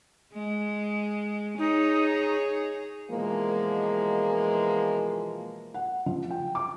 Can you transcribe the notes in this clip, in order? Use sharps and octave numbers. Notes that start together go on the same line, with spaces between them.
G#3
D#4 G#4 C#5
B2 E3 F3 G#3 A#3
F#5
F3
G5
D6